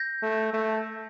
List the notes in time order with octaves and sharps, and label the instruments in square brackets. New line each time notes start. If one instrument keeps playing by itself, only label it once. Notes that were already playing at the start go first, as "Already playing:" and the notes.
Already playing: [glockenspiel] G6 A#6
[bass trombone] A3
A3